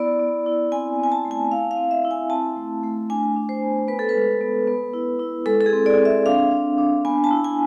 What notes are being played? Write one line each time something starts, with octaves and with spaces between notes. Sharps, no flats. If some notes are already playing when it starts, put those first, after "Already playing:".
Already playing: B3 E4 D5
B3
E4
C4 G#5
C4 G#5
A5
A3
G#5
E4 F5
F5
C4
E5
E4
G#5
C4 A5
A3
A3
D4 G#5
D4
C5
B3
B3 B4
A4
B4
G#3
B3
B3
E4
E4
G#3 A4
A4
G#4
C4
D5
C4
E5
D4 F5
D4
D4
B3 G#5
A5
E4
G#5